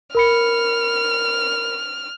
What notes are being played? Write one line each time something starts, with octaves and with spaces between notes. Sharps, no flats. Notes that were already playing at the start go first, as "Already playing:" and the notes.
A#4 B5 F6 C#7